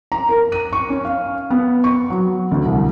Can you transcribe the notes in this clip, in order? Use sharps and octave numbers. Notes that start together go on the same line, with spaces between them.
A#5
A#4
D#7
C#6
C#4
F5
B3
C#6
F#3
D2
C2